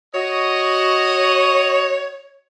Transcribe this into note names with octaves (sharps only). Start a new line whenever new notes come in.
F#4 C#5 D#5